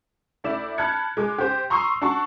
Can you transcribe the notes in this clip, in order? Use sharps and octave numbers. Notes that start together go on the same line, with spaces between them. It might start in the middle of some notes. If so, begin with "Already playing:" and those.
D2 E4 D5 E5 E7
A5 B5 F6 F#6 G#6 C#7
G#3 D6
G4 C5
A#5 C6 C#6 D#6 E6 C7
D4 F#4 A5 C#6